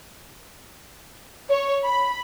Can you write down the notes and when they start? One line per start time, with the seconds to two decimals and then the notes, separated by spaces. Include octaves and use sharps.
1.50 C#5
1.85 B5